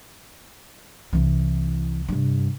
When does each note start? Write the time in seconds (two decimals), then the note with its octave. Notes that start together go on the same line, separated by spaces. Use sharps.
1.13 C2 E3
2.08 G2 C3